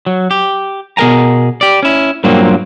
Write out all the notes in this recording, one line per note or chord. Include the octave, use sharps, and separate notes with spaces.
F#3
G4
B2 G#4 A#4 G#5 A#5
G4 D5
C#4 E4
G2 A#2 F#3 A#3 C4